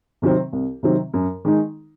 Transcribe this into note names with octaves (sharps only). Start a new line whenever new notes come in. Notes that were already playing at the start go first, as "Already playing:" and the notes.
C3 D#3 F#3 C4
C2
C3 D#3 F#3 C4
F#2
D#3 G#3 D#4